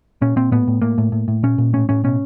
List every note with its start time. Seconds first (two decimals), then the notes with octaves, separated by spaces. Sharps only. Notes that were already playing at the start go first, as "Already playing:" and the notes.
0.22 A#2 C#4
0.36 A#2 C4
0.51 A2 B3
0.67 A2
0.82 A2 A#3
0.98 A2
1.12 A2
1.28 A2
1.43 A#2 C#4
1.58 A#2
1.73 A2 C#4
1.89 A2 C#4
2.04 B2 C#4